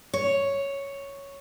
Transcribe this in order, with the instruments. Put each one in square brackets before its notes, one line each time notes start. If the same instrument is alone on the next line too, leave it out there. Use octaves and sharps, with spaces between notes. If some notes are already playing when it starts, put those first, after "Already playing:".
[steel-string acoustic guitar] C#5